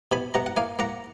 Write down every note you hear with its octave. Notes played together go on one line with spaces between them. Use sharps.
B2 G#5 B5
B2 F#5 A#5
F#5
A#3 F5 G#5
A#3 F#5 A#5